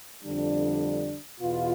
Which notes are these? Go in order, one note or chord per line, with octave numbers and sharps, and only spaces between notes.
F2 D3 G3 D4
E2 B2 B3 F4